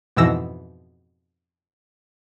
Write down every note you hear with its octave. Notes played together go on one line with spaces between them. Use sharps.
F2 G#2 B2 E3 E6 A#6